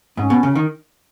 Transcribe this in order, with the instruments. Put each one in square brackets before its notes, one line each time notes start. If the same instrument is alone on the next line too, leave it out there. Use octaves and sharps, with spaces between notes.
[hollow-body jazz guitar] G#2 [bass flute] C#4
[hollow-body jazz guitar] B2
C#3
D#3